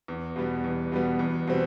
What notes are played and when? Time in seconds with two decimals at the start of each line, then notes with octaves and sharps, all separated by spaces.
0.08 E2
0.36 B2 G3 B3
0.64 E2
0.92 B2 G3 B3
1.19 E2
1.47 B2 G3 C4